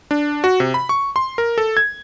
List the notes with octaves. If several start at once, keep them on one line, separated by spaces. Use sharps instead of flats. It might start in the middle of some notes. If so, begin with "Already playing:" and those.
D4
F#4
C3
B5
C#6
C6
A#4
A4
G#6